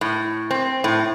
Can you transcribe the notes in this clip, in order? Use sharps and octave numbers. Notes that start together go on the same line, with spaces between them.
A2
C4
A2